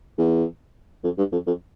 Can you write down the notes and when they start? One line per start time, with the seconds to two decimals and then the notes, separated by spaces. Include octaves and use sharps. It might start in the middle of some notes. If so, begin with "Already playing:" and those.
0.18 E2
1.04 F2
1.18 G2
1.32 F2
1.47 F2